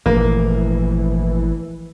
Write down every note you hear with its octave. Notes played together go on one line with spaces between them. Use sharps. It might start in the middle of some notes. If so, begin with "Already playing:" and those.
G#1 A#2 E3 F3 A3 A#3